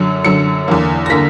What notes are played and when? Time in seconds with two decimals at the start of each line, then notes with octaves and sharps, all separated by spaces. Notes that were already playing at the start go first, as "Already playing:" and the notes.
Already playing: F#2 D3 F#3
0.24 F#2 D3 F#3 C#7
0.68 E2 D3 A#3
1.06 A#6
1.10 D3 A#3 B6